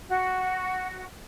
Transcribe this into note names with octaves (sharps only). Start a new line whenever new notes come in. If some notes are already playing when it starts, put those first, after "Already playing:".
F#4